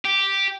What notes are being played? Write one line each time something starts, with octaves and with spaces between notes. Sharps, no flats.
G4